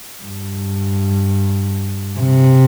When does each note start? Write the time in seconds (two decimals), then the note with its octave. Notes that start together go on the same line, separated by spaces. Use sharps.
0.23 G2
2.19 C3